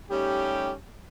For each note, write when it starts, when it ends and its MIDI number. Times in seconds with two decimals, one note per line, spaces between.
0.11 0.72 55
0.11 0.72 57
0.11 0.72 61
0.11 0.72 63
0.11 0.72 67